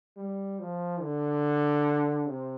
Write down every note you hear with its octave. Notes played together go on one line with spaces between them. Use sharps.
G3
F3
D3
C3